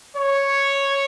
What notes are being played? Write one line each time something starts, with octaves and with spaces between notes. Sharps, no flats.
C#5